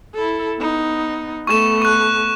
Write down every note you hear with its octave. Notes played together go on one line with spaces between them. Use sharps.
E4 A4
B3 D#4
A3 B3 C#6 E7
C#6 F#6